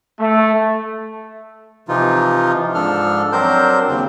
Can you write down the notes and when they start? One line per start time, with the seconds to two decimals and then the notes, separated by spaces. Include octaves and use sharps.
0.20 A3
1.89 C3 E3 F3 D#4 F4
2.75 G#2 F3 D4 A4 F6
3.32 F#3 C4 D4 A#4 C5 G6
3.88 D#2 C#3 C4